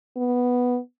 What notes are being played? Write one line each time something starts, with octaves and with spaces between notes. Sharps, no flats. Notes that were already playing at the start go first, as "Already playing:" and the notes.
B3